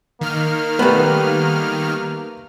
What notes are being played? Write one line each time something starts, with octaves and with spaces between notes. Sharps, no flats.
D#3 A#3 F6
G3 A3 B3 B4